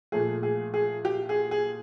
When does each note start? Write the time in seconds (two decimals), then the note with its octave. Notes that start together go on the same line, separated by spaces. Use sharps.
0.12 A#2 F3 A3 G#4
0.43 G#4
0.74 G#4
1.05 G4
1.29 G#4
1.51 G#4